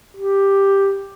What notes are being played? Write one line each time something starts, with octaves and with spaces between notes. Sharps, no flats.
G4